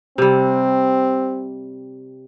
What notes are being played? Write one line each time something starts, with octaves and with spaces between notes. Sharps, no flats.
C3 G3 C4